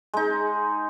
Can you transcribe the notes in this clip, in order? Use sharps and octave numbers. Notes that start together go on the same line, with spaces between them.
G#3 D#4